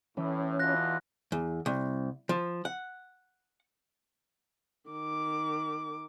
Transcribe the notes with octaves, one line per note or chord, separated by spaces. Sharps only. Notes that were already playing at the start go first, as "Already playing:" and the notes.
A2 E3 C#4
E2 B2 F4 F#6 A#6
E2
C2
F3
F#5
D#3 D6